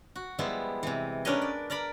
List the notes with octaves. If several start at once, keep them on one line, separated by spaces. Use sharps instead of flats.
F#4
F3 G3 G#3 B3 E4
C3 E3
C#4 D4 A#4 B4 C#5 D#5
D5
A#4 D5 A#5 B5